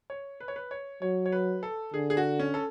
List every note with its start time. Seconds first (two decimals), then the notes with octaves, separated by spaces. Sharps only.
0.10 C#5
0.40 B4
0.48 C#5
0.56 B4
0.71 C#5
1.02 F#3 C#5
1.26 C#5
1.32 B4
1.63 A4
1.94 D3 G#4
2.10 G#4
2.17 F#4
2.39 C#4
2.54 A4